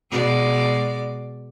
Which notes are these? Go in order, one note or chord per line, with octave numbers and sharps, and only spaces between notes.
B2 G#3 D5